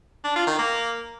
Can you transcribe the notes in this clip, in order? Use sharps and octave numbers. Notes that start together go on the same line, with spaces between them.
D4
F4
D#3
A#3